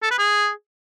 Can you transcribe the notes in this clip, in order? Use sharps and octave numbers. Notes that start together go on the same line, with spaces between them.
A4
B4
G#4